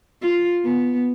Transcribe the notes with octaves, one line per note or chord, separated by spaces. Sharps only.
F4
B3